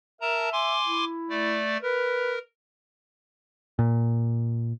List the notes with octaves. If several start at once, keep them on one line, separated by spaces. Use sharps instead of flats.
A#4 E5 A5 A#5
G#5 C6 D6
E4
A3 D5
A#4 B4
A#2